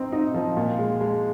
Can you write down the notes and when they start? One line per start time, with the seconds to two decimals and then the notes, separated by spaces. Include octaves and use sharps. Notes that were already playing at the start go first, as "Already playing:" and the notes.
Already playing: C4 D#4
0.12 D#4
0.34 F3
0.57 A#2
0.79 G#3
1.01 G#3